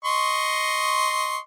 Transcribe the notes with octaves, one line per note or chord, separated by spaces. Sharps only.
D#5 C6 C#6